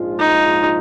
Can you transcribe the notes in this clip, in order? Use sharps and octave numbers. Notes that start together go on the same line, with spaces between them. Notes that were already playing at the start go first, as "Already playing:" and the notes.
Already playing: A#1 G#2 F3 G#3 F4
D#4